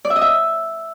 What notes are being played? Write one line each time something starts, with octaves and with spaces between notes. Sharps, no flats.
D5
E5
D#5
E5